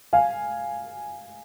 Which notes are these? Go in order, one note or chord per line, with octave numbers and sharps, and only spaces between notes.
F5 G#5